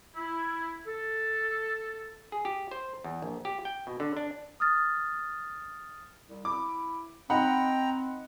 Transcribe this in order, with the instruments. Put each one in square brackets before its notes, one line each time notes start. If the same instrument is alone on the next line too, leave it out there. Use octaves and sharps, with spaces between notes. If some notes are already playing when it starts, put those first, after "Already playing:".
[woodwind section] E4
A4
[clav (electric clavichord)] G#4
G4
C5
E2
A#1
G4
G5
B2
D3
D4
[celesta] D#6 F6 A6
[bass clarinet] C2
[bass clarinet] E4 [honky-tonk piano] D6
[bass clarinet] C4 [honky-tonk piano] D#4 F#5 B5 [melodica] G5 A#5